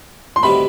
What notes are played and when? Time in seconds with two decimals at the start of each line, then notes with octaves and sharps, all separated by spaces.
0.36 C6
0.43 D2 C3 D#3 G3 B3 B5